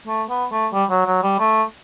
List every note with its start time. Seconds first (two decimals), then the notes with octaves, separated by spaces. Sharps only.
0.07 A3
0.30 B3
0.51 A3
0.73 G3
0.90 F#3
1.06 F#3
1.23 G3
1.39 A3